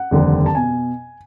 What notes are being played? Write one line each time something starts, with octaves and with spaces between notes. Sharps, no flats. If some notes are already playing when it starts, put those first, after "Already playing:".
Already playing: F#5
F1 D#2 D3 G3 C4
A5
B2 G#5